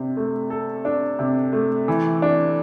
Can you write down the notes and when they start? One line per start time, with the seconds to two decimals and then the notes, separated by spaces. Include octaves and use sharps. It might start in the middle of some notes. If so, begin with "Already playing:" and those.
Already playing: C3 D4
0.17 A3
0.50 A4
0.85 D4
1.19 C3
1.53 A3
1.88 E3
2.22 D4